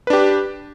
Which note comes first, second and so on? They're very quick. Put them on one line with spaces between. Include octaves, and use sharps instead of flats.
B4 D4 G4